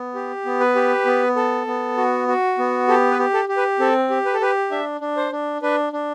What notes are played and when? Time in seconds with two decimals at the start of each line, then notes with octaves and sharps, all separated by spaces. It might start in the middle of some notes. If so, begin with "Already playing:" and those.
Already playing: B3
0.15 G4
0.45 B3
0.60 B4
0.75 G4
1.05 B3
1.36 A4
1.67 B3
1.97 F#4
2.28 F#4
2.58 B3
2.88 G4 A4
3.11 B4
3.19 G4
3.34 A4
3.49 G4
3.57 B4
3.79 C4 A4
4.10 G4
4.25 B4
4.34 A4
4.41 G4 B4
4.71 D4 E5
5.01 D4
5.17 C5
5.32 D4
5.62 D4 B4
5.93 D4